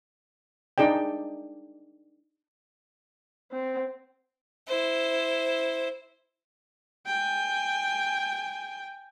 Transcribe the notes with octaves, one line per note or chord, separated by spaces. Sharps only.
D4 D#4 G#4 D5 G5
C4
E4 C5
G5 G#5